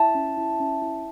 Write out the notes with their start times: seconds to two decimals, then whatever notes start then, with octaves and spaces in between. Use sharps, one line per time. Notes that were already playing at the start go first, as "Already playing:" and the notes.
Already playing: E4 E5 A5
0.15 C#4
0.37 E4
0.60 C#4
0.82 E4